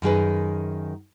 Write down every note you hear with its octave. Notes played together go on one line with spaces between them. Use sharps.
F#2 D#3 G#4 B4